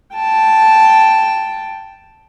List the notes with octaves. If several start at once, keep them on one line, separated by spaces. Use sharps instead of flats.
G5 A5